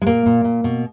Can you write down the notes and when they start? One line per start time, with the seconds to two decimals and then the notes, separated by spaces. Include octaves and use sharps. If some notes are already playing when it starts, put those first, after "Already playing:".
0.02 G#3
0.07 A#2 A#3
0.26 A#2
0.44 A#2
0.64 B2